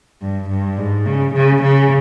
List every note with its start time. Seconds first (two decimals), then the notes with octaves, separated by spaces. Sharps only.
0.22 G2
0.49 G2
0.78 G#2
1.06 C#3
1.34 C#3
1.62 C#3